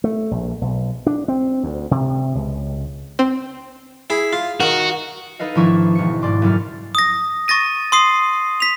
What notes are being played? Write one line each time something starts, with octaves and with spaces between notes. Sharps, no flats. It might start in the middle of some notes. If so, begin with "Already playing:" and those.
A3
A#1
B1
D4
C4
D2
C3
C#2
C4
E4 G#4
F4
D#3 F#4 A#4
D#4 A4 B4 D#5 F5
G#1 F3 D4 E4 C#6
E1 C#6 C#7
G#2 D5 C6 D6
F#1 E4 A4 F6
D#6 A#6
C#6 A6 A#6 D#7
C6 D#6 C7
B6 F7